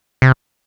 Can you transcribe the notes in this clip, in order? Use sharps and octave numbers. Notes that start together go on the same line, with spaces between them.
C3